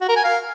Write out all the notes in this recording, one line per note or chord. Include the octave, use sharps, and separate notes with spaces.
F#4
A#4
G#5
F5